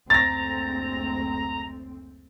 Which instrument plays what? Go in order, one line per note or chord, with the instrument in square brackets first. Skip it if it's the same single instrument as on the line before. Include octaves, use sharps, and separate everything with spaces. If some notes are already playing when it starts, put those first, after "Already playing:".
[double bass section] F#1 D2 C4 [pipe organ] A#5 [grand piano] A6 A#6